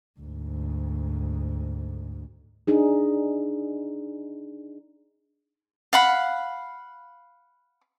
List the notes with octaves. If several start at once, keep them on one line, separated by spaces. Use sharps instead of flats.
D2 G#2
D4 D#4 G#4
F5 F#5 B5